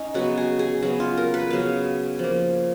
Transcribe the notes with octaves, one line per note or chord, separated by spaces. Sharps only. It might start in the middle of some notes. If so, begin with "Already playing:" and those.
Already playing: C#4 D#4
C#3 F#3 B3 F#4
G#4
G#4
C#3 F#3 B3 F#4
F4
A#4
B4
C#3 F#3 B3 F5
F3 A#3